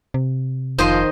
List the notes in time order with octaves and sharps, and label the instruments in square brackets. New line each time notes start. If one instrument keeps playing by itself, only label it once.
[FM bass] C3
[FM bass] F1 [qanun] D#3 [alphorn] F3 [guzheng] C5 D#5 C6